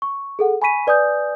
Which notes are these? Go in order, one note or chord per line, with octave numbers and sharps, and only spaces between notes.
C#6
G#4 A4 F#5
G#5 B5 C#6 B6 D#7
B4 D5 G#5 D#6 G6